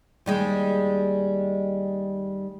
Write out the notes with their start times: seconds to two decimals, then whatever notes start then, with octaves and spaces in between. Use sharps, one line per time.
0.26 D#2 G3 G#3